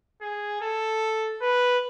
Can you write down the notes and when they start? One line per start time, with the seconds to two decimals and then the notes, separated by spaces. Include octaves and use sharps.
0.21 G#4
0.61 A4
1.42 B4